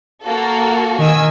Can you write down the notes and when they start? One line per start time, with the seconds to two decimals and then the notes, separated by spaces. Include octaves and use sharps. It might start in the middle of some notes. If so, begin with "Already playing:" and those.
0.23 A#3 F#4 A4
0.99 D#3 G#5 E6